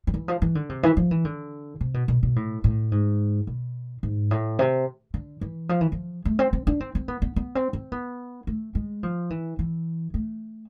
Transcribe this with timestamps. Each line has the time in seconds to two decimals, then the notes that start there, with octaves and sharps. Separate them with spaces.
0.07 F3
0.14 E3
0.28 F3
0.42 E3
0.55 D3
0.69 C3
0.83 E3
0.97 F3
1.11 E3
1.25 D3
1.81 C3
1.94 B2
2.08 B2
2.23 B2
2.36 A2
2.64 A2
2.92 G#2
3.47 B2
4.03 G#2
4.31 A2
4.59 C3
5.14 D3
5.41 E3
5.69 F3
5.81 E3
5.92 F3
6.25 A3
6.39 C4
6.53 C4
6.67 D4
6.80 C4
6.95 C4
7.08 B3
7.22 B3
7.36 B3
7.55 C4
7.73 C4
7.92 B3
8.47 A3
8.75 G#3
9.03 F3
9.30 E3
9.59 E3
10.14 A3